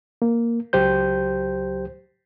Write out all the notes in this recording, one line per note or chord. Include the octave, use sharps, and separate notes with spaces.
A#3
C#2 F#3 G4 C5 G6